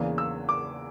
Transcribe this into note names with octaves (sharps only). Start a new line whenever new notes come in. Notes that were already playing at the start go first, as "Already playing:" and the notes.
Already playing: E2 C#3 E3 A#3 D4
E6
D6